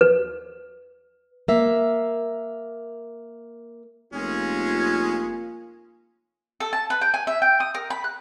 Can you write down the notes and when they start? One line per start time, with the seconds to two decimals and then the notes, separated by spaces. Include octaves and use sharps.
0.01 B4
1.48 A#3 E5
4.13 F1 G#3 A#3 C#4 F4 G#4
6.60 A4
6.73 A5
6.90 B4
7.01 G5
7.14 G#5
7.27 E5
7.42 G5
7.60 D#6
7.75 A#4
7.90 B5
8.04 F#6